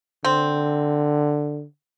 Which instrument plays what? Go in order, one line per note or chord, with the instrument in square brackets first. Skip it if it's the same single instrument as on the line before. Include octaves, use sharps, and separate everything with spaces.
[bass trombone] D3 [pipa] C4